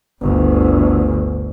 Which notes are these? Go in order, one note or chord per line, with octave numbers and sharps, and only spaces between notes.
G1 D2